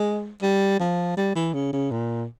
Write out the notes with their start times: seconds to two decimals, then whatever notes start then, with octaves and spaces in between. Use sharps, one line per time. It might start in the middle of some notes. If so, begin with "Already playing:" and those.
Already playing: G#3
0.42 G3
0.80 F3
1.17 G3
1.36 E3
1.54 C#3
1.73 C#3
1.91 A#2